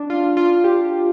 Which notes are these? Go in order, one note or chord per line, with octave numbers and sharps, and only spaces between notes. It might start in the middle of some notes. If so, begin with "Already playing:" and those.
Already playing: D4
F4
F4
G4